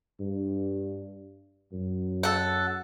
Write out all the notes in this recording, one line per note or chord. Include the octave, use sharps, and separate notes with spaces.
G2
F#2
A4 F#5